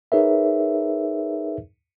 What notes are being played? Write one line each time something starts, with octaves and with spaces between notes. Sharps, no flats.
D#4 G#4 A#4 B4 C#5 E5